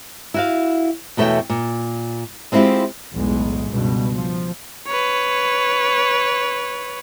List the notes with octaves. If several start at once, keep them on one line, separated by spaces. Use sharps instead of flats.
E4 F#4 F5
E2 B2 A3 C#5 E5 G5
A#2
G#3 C4 D4 E4 F4 G4
B1 E2 A2 G#3
C#2 G2 B2
F3
B4 C#5